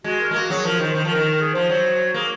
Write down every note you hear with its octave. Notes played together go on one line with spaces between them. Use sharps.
G#3 F#4
A#4
G#3
A#3 F#4
F#3 G#4
F3 A#4
D#3 C5
D#3 C5
F3
D#3 A#4
A#4
G#4
F3 C5
F#3
A#3 G#4